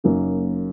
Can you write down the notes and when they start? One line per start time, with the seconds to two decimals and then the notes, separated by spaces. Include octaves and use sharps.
0.04 F#1 F#2 F#3 A#3 D#4